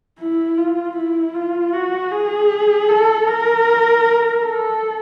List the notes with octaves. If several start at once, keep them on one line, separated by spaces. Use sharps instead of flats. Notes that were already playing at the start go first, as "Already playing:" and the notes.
E4
F4
E4
F4
F#4
G#4
A4
A#4
A4